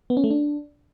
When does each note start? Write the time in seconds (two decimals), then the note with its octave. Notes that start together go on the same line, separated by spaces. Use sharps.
0.10 B3
0.17 C#4
0.24 A3
0.31 D4